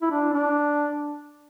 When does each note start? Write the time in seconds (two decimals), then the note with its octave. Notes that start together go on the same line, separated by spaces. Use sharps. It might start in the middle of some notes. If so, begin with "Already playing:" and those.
0.02 E4
0.11 D4
0.33 D4